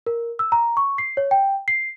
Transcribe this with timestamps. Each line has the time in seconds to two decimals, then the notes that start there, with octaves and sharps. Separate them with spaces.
0.07 A#4
0.39 E6
0.52 A#5
0.77 C#6
0.98 C7
1.17 C#5
1.31 G5
1.68 C7